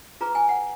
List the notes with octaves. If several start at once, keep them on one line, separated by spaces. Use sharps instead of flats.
F4 G#4 B4 A#5
G#5
F#5